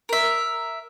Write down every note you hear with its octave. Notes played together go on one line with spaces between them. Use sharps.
A#4 E5